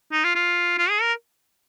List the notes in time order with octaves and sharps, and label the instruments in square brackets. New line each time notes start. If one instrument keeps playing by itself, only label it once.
[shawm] D#4
F4
F4
F4
G#4
A#4